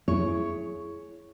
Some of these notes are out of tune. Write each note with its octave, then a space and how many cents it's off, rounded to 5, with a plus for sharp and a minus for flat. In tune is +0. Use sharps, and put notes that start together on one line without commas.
E4 +20 G#4 +15 C#5 +0